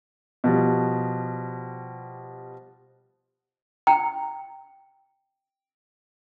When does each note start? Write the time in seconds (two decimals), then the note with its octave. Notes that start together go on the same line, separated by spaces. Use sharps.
0.44 B2 F3 G3
3.87 G5 A#5